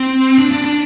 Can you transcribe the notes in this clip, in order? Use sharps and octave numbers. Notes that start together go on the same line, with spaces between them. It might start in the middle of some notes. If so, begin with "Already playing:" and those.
Already playing: C4
D4
D4
D4